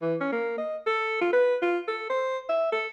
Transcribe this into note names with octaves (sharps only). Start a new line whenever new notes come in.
E3
C#4
A#3
D#5
A4
F4
B4
F4
A4
C5
E5
A4